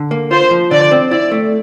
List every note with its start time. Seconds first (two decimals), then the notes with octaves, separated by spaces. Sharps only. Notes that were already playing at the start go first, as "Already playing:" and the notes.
Already playing: D3
0.11 A#3
0.31 F4 C5
0.51 F3
0.71 D3 D5
0.91 C4
1.11 E4 D5
1.32 A3